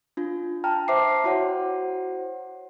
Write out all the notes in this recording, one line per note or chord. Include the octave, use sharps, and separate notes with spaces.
D4 F4
G5 A5 A#5 F6
C5 E5 D6 C7
E4 F#4 C5 C#5 F#5